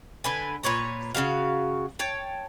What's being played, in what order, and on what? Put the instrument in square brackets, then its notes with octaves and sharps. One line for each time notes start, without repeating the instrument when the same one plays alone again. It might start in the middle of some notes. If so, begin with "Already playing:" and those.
[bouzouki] D3 B4 G#5
A#2 B4 C#5 A#5
C#3 A#3 F#4 F5
C#5 G5 A5